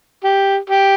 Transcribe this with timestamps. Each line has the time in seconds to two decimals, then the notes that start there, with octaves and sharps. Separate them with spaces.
0.24 G4
0.70 G4